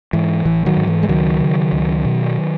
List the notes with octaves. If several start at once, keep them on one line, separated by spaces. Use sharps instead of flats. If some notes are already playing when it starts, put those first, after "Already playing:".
G#2 E3
A1 E3
D#3 F#3
G#2
E3
G#3
C#2 D#3 F#3
C#3
C#2
B2